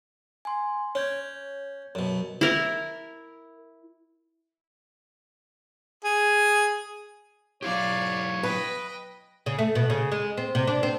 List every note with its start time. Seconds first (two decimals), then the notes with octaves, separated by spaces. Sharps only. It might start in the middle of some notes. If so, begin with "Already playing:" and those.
0.45 G#5 C6
0.95 C#4 C#5 G6 G#6
1.95 F#2 B2
2.41 E4 A#4
6.04 G#4
7.62 F#3 E4 G4 C#5 D5 F5
8.43 B4 D#5 G5
9.46 C#3
9.59 A3
9.75 B2
9.90 C#3
10.12 G#3
10.37 C4
10.55 C3
10.67 D4
10.83 C4